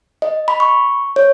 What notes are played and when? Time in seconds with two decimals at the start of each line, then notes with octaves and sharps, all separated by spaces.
0.22 D#5
0.48 B5
0.60 C#6
1.16 C#5